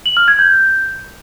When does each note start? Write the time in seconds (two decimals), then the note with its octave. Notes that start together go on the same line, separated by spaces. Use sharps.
0.06 F#7
0.17 F6
0.28 G#6
0.39 G6